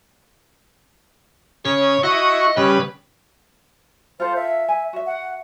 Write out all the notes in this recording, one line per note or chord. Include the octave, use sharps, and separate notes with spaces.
C#3 C#5
E4 F#4 D#5 C#6
C#3 G3 B4
F4 A4 C5
E5
G#5
F#4 E5
F#5